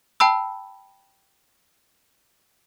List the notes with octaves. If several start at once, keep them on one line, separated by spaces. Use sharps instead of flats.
G5 A5 B5 E6